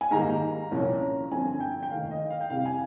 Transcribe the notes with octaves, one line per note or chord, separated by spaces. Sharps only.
G#5
G#2 D#3 G3 A#3 A#5
C2 A#2 F3 A#3 C#4
G1 G2 F3 C4 G#5
G5
G5
F1 D#2 D#3 F5
D#5
F5
G5
C2 C3 G3 F5
G#5